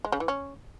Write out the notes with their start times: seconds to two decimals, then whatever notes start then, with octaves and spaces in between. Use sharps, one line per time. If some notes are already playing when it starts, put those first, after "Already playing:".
0.05 G#3
0.12 C#3
0.20 E3
0.28 C#4